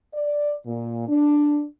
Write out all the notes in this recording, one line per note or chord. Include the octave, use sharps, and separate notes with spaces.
D5
A#2
D4